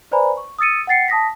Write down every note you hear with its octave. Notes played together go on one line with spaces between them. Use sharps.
B4 C5 D5 G#5 A#5 B5
C#6
D#6 E6 A6 C#7 D#7
F#5 G5 A6 C7 C#7
A5 D#6 A#6 B6